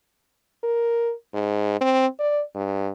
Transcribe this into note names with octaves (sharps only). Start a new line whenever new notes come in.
A#4
G#2
C4
D5
G2